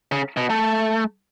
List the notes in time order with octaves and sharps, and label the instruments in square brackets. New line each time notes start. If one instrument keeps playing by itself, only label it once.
[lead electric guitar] C#3
B2
A3